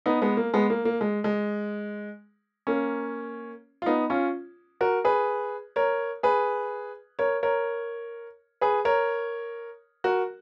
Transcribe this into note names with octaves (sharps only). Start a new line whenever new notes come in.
B3 D#4
G#3 B3
A#3
G#3 B3
A#3
A#3
G#3
G#3
A#3 C#4
F4
B3 D#4
C#4 F4
F#4 A#4
G#4 B4
A#4 C#5
G#4 B4
A#4 C#5
A#4 C#5
G#4 B4
A#4 C#5
F#4 A#4